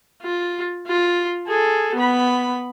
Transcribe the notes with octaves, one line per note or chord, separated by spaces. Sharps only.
F4
F4
G#4 A4
B3 B5